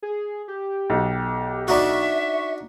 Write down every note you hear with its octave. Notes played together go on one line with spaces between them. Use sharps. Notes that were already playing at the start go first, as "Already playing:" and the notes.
G#4
G4
B1
D4 D#4 F#4 E5 C#6